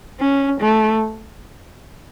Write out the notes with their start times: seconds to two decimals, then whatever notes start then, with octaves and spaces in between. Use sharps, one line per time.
0.20 C#4
0.61 A3